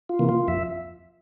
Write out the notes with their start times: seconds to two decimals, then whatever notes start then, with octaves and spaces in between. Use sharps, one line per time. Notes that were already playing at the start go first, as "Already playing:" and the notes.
0.09 F4
0.19 C3 E3 A#3
0.29 F4
0.48 F2 E5